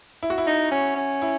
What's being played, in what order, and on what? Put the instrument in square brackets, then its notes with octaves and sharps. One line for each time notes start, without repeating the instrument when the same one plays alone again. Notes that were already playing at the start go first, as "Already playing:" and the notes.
[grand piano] E4
F#4
E4
[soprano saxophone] D#4
C#4
C#4
[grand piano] E4